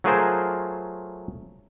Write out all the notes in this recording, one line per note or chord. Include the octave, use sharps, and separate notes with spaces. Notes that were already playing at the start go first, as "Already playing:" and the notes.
F#3 A3 F4 G#4 A#4 C5